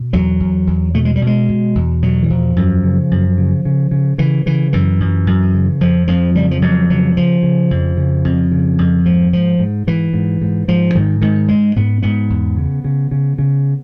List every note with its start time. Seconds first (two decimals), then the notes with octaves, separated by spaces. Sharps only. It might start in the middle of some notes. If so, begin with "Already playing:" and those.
Already playing: B2
0.13 E2 F#3
0.40 E2
0.67 E2
0.94 B2 A3
1.05 G#3
1.16 G3
1.22 B2
1.27 G#3
1.49 B2
1.75 E2
2.02 B2 F#3
2.23 E3
2.30 E2 F3
2.56 F#2
2.84 C#3
3.11 F#2
3.38 C#3
3.65 C#3
3.91 C#3
4.18 C#3 E3
4.46 C#3 E3
4.73 F#2 E3
5.00 F#2
5.27 F#2
5.54 C#3
5.81 F2 F3
6.08 F2 F3
6.35 C#3 G3
6.51 F3
6.62 F2 F#3
6.90 C#3 F#3
7.17 C#3 F3
7.43 C#3
7.71 F2
7.97 C#3
8.25 F2
8.52 C#3
8.78 F2
9.05 G#2 F3
9.33 G#2 F3
9.59 G#2
9.87 G#2 E3
10.13 G#2
10.41 G#2
10.68 G#2 F3
10.95 G#2 D#3
11.21 G#2 D#3
11.48 G#2 G#3
11.76 G#2 B3
12.02 G#2 B3
12.30 E2
12.57 C#3
12.84 C#3
13.11 C#3
13.38 C#3